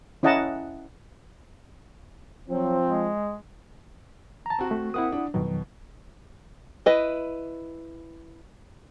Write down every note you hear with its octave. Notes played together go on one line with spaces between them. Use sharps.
C#4 E4 D#5 F#5 A5 A#5
F3 F#3 C4
G#3
A5 A#5
C4 F#4
A3
A#3 C4 E4 F#5 D#6
D4
F2 B2 D#3 F#3
E4 B4 D#5